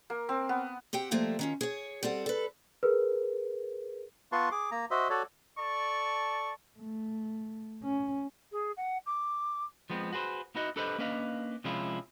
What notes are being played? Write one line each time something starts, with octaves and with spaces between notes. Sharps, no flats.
A#3
C4
B3
C4 G4 F#5 G5
F3 G3 A3 A#3 F4
D#3 C#4 F4
G#4 C#5
G3 C4 A4 F#5
A4 B4
G#4 A#4 B4
B3 F4 B4 A5 C6 C#6
G#4 D6
A#3 A#5
F#4 C5 D#5 E5
F#4 A4 C#5 D5
A4 D5 A5 C#6
A3
C#4
G#4
F#5
D6
F3 G#3 B3 C4
F#4 G#4 B4 C5
B3 D#4 E4 F#4 D#5
D4 G4 A4 B4 C5 D#5
A#3 C#4 D4 B4 D#5 F5
C3 F3 G#3 C#4 E4 F4